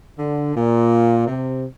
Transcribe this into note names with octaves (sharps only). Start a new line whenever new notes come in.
D3
A#2
C3